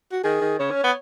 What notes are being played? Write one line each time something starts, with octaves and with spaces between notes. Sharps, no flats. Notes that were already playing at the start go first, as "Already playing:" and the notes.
F#4
D#3 G#4
D#3
C#3 C#5
C#4
B3